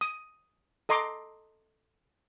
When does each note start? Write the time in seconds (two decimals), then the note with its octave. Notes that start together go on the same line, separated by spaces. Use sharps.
0.01 D#6
0.89 A4 D#5 A#5 C6 D6